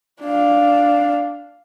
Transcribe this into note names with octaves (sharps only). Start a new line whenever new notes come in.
D4 F5